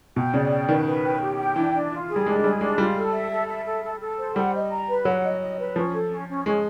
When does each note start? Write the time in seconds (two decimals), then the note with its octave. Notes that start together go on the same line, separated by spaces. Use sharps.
0.16 B2 G5
0.34 C#3 D5
0.51 G5
0.68 D#3 B4
0.86 B4
1.03 G5
1.21 G4
1.38 G5
1.56 E3 D4
1.73 D4
1.91 F4
2.08 G#4
2.16 G3
2.26 G#3 D4
2.36 G#3
2.43 G3 G#4
2.61 G#3 D4
2.78 G3 F4
2.96 A4
3.13 E5
3.31 A4
3.48 E5
3.65 A4
3.84 A4
4.00 A4
4.18 C5
4.36 G3 F#5
4.54 D#5
4.70 A#5
4.89 B4
5.05 F#3 F#5
5.24 D#5
5.40 D#5
5.59 B4
5.75 F3 C#4
5.93 A4
6.10 C#4
6.29 C#4
6.46 G#3 C#4